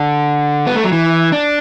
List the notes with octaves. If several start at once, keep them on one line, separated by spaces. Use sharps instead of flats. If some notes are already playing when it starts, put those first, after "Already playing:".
Already playing: D3
B3
A3
F#3
E3
D4